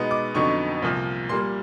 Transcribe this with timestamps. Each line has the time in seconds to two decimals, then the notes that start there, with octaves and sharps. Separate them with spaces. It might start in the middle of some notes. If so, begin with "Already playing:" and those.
Already playing: B2 G#3 B3 D#4
0.11 D6
0.34 F2 D3 F#3 B3 D#4 C#6
0.82 C2 A#2 F3
1.29 A#2 G3 A#3 C6